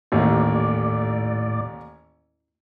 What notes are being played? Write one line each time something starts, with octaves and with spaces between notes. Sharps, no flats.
A1 D#2 A2 D5